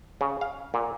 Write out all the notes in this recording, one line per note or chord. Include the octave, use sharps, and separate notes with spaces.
C#3
F5
A#2